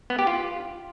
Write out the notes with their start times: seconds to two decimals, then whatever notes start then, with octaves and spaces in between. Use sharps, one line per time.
0.10 B3
0.19 G4
0.27 F4